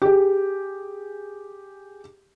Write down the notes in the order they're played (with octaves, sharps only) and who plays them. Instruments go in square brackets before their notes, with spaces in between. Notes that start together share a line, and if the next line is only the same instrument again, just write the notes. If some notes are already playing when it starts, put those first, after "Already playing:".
[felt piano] G4 G#4